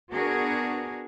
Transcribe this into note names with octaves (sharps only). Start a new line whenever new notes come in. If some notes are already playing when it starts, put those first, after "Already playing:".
B3 D4 F#4 G#4 A#4